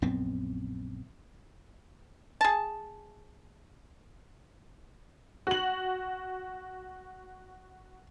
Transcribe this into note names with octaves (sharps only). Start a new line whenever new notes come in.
A#1 F#2 B3 C4
G#4 A5
F#4 F#7